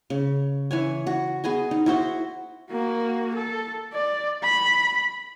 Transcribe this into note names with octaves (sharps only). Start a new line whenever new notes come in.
C#3
E3 C#5 G#5
F#4
B3 G#4 D#5 G#5
D#4
E4 F#4 C5
A#3 F#4
A4
D5
B5